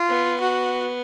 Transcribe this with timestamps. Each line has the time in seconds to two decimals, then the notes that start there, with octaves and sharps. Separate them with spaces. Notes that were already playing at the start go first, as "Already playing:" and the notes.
Already playing: F4
0.09 B3
0.40 F#4